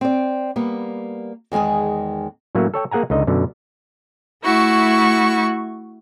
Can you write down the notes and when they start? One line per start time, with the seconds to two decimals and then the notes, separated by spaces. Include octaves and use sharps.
0.01 C4 D5
0.56 G3 A#3 B3
1.52 E2 D#3 G#3 G#4 G#5
2.55 A2 F#3 A3 A#3 C#4
2.74 A4 C#5 G5
2.91 A#3 G#4 F#5 G#5 A#5
3.10 C#2 D3 D#4 D#5
3.27 F#2 B2 D3
4.43 A3 E4 F#4 C#6